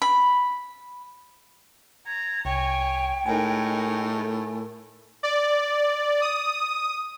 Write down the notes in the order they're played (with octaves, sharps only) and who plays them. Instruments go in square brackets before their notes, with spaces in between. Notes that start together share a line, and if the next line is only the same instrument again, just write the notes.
[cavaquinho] B5
[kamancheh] A#5 [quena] G#6
[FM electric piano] C2 [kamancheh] C#5 G#5 [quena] G5
[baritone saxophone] A2 [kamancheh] G#3 D#4 [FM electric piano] A#4 G#5
[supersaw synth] D5
D#6